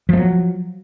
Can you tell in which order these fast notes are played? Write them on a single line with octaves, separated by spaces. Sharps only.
F3 A3 F#3